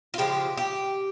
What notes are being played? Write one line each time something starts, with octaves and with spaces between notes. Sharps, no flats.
F4
C#3 F3 G#3 G4
G4